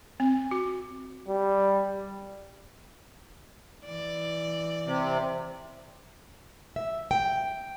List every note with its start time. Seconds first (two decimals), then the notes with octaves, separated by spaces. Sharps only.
0.20 C4
0.51 F#4
1.28 G3
3.85 E3 D5
4.86 C3
6.76 E5
7.11 G5